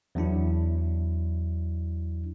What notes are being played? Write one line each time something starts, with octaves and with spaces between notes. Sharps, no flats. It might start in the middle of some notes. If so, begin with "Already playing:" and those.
E2 F#3 D4 E4